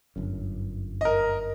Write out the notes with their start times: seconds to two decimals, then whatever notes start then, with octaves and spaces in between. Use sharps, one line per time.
0.16 G1 F#2
1.01 A#4 D#5